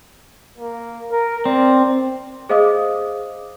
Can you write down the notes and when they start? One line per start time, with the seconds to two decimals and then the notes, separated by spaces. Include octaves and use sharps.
0.58 A#3
1.11 A#4
1.45 C4 D5
2.49 G#4 C5 D#5 F5 D6 D#6